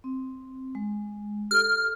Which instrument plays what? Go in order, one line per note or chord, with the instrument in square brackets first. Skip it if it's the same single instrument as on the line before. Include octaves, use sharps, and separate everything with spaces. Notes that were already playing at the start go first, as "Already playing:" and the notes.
[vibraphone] C4
G#3
[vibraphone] G4 A4 [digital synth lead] F6